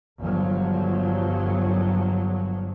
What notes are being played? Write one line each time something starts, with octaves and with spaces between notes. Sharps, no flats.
G1 F3 F#3